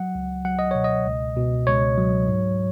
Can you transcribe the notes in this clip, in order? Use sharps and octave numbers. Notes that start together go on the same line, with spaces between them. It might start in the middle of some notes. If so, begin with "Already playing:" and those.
Already playing: F#3 F#5
C#2
F#3 F#5
D#5
B2 C#5
D#5
C#2
B2
C#2 C#5
F#3
G#2